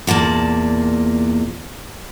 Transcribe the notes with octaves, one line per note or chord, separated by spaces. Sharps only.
E2 A#2 D5 A5